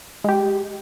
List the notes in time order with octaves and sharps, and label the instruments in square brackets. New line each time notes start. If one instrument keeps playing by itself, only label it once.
[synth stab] G#3 G4